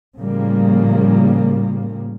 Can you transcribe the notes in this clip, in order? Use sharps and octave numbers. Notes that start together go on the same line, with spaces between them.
A2 C#3 F3 G3 A#3